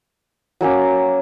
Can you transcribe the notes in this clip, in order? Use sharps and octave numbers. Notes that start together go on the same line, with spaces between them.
F#3 A#3 C#4 D6